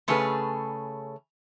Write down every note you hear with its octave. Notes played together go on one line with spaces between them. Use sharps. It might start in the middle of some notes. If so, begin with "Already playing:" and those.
C#3 A3 C#4 G#4 A4 B4